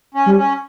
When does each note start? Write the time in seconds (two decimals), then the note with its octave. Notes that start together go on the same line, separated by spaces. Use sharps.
0.14 C#4
0.26 G3
0.37 C#4